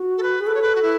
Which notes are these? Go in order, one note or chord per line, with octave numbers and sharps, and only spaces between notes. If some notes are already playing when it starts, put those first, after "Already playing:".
Already playing: F#4
A4
B4
G#4
A4 B4
C#5
B4
F#4
E4